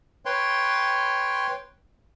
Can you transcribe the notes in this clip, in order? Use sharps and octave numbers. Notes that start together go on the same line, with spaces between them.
B4 C#5 G5 C6